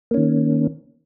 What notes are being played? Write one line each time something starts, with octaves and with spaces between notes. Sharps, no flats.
D#3 A#3 C#4